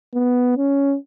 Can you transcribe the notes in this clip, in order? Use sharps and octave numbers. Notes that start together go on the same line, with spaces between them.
B3
C#4